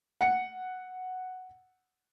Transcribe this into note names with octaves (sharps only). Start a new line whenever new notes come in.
F#5 C#7